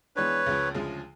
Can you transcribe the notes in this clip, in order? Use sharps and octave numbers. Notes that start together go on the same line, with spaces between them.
E3 G#3 B3 D4 B4 C#5
C#2 C#3 F3
D2 C#3 F3 G#3